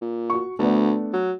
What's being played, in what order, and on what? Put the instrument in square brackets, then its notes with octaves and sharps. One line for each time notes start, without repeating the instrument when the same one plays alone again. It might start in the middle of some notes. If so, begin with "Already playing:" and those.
[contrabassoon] A#2
[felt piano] F#4 C#6
[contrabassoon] D2 [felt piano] A3 B3 D4
[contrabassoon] F#3